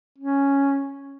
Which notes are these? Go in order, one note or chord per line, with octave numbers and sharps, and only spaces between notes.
C#4